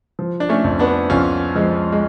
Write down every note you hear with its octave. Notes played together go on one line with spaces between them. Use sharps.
F3
D4
A3 C#4
F2
B3 D4
F2 C#4 F4
F3 G#3
G#3